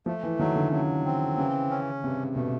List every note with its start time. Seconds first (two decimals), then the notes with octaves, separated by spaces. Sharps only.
0.06 F3 A3
0.23 E3
0.39 D#3 F#3
0.56 D3
0.72 C#3 F#3
1.05 C4
1.37 C#3 E3
1.71 C#4
2.03 G2 C3
2.36 B2 A3